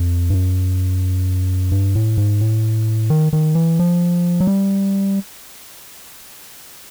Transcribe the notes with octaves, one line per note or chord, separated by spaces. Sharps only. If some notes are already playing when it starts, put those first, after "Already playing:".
Already playing: F2
G2
F#2
G2
A2
G#2
A2
D#3
D#3
E3
F3
F#3
G3